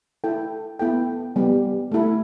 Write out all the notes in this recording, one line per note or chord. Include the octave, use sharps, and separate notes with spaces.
E4 A4 G5
B3 E4 A4 G5
G3 B3 G4
A3 E4 A4